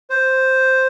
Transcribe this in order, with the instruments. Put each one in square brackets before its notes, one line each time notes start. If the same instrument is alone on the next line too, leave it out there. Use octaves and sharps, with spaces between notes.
[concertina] C5